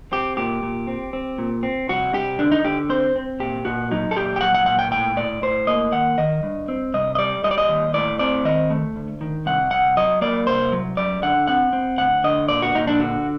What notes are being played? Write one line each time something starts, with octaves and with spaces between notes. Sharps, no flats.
C4 G4
A#2 G4
A#2
C4
C4
A#2
C4
C2 F#4
C2 G4
D3 D4
D#4
D3 G4
C4 C5
C4
A#2 G4
A#2 F#4
F#3 D#4
A4
A#2 G4
G5
F#3 F#5
F#5
A#2 F#5
G5
A2 G5
A2 D5
A2 C5
A#3 D#5
D#2 F#5
D#3 D#5
G2
C4
C2 D#5
D#5
G3 D5
G3 D#5
D5
D#5
D#2
A2 D5
C4 D5
D#3 D#5
A3
D2
D#3
C2 F#5
C2 F#5
F#3 D#5
A#3 D5
C2 C5
F#3
F#2 D5
D3 F#5
C4 F#5
C4
D2 F#5
D3 D#5
A#2 D5
F#4
A#2 D#4
D4
D3 F#4